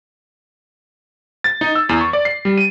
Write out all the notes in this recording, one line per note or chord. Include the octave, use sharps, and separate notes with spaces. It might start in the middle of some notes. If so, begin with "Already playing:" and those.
A6
D#4
E6
E2
C#6
D5
C7
G3
D#7